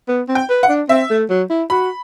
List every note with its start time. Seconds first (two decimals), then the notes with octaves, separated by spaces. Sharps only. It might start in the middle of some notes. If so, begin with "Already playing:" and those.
0.08 B3
0.28 C4
0.35 G5
0.50 B4
0.63 F#5
0.69 D4
0.89 C4 E5
1.10 A3
1.30 F#3
1.50 E4
1.70 F#4 B5